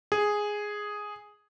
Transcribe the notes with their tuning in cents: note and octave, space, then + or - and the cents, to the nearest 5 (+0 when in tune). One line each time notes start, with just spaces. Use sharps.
G#4 +0